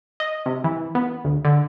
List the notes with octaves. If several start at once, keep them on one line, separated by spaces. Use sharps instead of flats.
D#5
C3
E3
B3
D2
D3